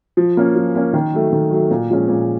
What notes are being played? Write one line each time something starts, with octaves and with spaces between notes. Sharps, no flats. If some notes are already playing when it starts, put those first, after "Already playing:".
F3
A#3 C#4
F3
A#3 C#4
D#3
F#3 A3
D#3
F#3 A3
A#2
F3 G#3 C#4
A#2